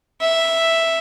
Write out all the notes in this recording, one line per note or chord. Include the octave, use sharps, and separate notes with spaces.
E5